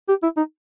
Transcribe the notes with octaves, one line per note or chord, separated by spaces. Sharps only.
G4
E4
D#4